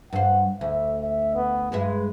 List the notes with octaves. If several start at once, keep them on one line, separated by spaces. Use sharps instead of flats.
G2 C5 F#5
D2 E5
E5
B3
G2 G#3 B4 E5